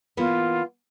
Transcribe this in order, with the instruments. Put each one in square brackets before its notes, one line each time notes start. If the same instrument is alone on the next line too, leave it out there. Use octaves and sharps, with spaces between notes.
[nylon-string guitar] E3 A#3 B3 [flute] F4